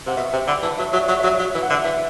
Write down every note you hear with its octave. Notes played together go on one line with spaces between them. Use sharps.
C3 F#5
B2 E5
C3 G5
D3 B5
E3 A5
F#3 E5
F#3 E5
D5
F#3
F#3 E5
F#3 E5
E3 E5
F#5
D3 E5
E3 E5